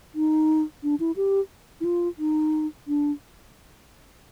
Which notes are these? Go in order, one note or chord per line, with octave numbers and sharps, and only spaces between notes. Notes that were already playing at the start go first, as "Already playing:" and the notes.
D#4
D4
E4
G4
E4
F4
D#4
D4